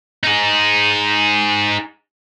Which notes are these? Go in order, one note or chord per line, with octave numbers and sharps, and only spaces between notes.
D#4 G#4